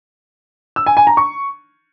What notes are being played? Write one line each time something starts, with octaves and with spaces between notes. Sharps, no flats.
E6
G#5
G#5
A#5
C#6